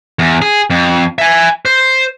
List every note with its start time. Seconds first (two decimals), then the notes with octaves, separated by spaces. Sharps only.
0.19 E2
0.42 G#4
0.70 F2
1.18 E5 G#5
1.65 C5